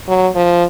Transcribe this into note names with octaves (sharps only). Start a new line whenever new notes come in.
F#3
F3